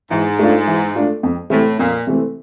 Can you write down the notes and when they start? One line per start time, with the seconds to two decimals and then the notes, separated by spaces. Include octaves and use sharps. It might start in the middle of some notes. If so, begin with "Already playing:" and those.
0.11 G#2 E3
0.39 A3 D4 F4
0.67 E3
0.95 A3 D4 F4
1.23 F2
1.50 A2 C3 E3 A3 C4
1.78 F2 A#2
2.07 C3 E3 A3 C4